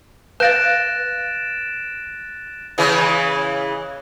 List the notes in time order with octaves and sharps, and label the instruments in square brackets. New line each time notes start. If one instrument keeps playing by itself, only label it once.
[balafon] B4 F5 [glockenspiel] F#6 A#6 [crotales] A6 D7 E7
[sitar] C#3 E3 G#3